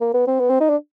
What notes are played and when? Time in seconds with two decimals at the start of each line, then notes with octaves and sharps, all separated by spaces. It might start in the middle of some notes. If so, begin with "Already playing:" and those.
0.01 A#3
0.14 B3
0.27 C4
0.40 B3
0.49 C4
0.60 D#4
0.69 D4